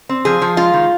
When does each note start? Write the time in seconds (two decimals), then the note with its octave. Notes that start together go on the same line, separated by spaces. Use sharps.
0.09 C4
0.25 F3 G#4
0.42 F3
0.57 G#3 F4
0.74 D#3